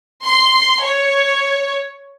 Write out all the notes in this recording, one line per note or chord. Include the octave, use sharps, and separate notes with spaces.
C6
C#5